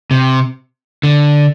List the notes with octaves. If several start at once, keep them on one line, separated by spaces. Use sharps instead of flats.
C3
D3